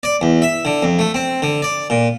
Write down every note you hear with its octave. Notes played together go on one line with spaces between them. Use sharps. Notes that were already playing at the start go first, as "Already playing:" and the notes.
D5
E2
E5
D3
F2
A3
C4
D3
D5
A#2